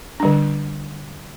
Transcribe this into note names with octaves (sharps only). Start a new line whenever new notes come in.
D3 G3 D4